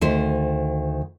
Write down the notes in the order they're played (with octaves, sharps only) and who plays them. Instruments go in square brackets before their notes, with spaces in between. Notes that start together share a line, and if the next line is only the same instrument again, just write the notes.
[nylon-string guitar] D2 D#3 C5